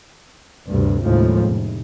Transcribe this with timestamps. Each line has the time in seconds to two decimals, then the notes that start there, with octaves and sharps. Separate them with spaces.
0.69 D2 G2 C3
1.04 D#2 A2 C#3 F3 G#3
1.46 F1